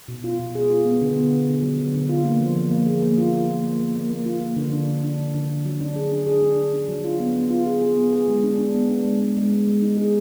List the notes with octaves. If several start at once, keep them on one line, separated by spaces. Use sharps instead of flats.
B2
F4
B2
G#4
F4
B3
D3
B3
D3
D3
F#3
D3
D3
F4
A#3
F3
F3
A#3
G#4
A#3
F4
F4
A#3
A#3
A#3
A#3
A#3
F4
A#3
D3
D4
D3
D4
D3
D3
D3
F#3
D4
G#4
D4
G#4
D4
G#4
D4
F#3
F4
B3
B3
F4
G#4
G#4
B3
G#4
G#3
D4
D4
B3
D4
G#3
D4
G#3
G#3
G#3
D#4
G#4